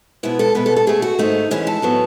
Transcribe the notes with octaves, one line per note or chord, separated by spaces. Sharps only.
B2 G#3 B3 E4
A4
B2 G#3 B3 B4
A4
A4
B2 A3 G#4
F#4
G#2 D#3 A3 D#4
F#2 E3 G#3 C#4
A4
A2 F#3 B3